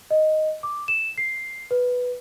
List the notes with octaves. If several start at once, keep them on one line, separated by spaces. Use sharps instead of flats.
D#5
D6
E7
C7
B4